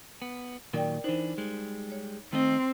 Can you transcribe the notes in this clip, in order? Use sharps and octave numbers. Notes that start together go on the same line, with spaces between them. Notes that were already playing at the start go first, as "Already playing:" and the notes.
B3
A#2 D#3 F#3 A#4 D5 G5
E3 D4 D#4 C5
G3 G#3
C#5
D#3 A3 C4 D#5